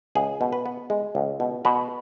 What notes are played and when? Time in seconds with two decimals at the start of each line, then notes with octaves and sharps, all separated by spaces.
0.15 C#2 G#4
0.41 B2
0.53 B4
0.66 B3
0.90 G#3
1.15 C#2
1.40 B2
1.65 B2 B4